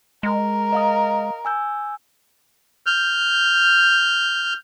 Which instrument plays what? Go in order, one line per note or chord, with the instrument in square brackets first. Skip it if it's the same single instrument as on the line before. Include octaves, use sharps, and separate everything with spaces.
[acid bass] G#3 [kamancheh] A#4
[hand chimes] D#5 F5 D#6
G#5 E6 G6
[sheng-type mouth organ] F6 G6